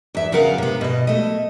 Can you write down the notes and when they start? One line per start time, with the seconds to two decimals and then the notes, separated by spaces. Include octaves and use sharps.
0.15 E2 E5
0.32 C#3 B3 A#4 F5 F#5 A#5
0.58 C3 B3
0.81 B2 D#5
1.07 A3 D#5